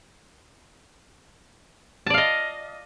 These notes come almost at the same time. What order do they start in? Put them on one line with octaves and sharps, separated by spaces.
A5 D5 F5 D#5